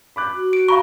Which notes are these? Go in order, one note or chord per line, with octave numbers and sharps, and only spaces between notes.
B5 D6 F#6
F#4
D7
F5 A#5 B5 C#6